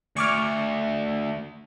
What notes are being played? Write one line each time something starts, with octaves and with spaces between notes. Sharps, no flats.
D2 C#6 D6 F6